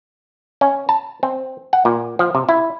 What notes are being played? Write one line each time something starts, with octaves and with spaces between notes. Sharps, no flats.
C#4
A5
C4
F#5
A#2
F3
C3
E4